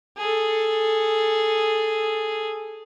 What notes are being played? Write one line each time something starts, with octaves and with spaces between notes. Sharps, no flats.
G#4 A4